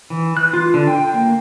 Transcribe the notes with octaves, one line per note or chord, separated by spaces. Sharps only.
E3
F#6
F4
D3
G5
A#3